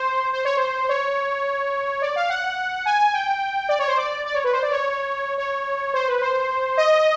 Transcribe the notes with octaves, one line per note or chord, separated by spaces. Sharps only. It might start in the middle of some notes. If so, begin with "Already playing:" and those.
Already playing: C5
C5
C#5
C5
C#5
D5
F5
F#5
G#5
G5
D5
C#5
C5
D5
D5
C#5
B4
C5
D5
C#5
C#5
C5
B4
C5
D#5